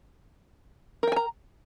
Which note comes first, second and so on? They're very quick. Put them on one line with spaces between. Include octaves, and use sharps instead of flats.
A#4 G5 G#5 A#5